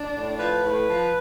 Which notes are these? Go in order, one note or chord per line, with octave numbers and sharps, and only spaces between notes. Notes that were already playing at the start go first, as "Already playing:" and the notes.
Already playing: D4
A2
F3 B4
A2
F3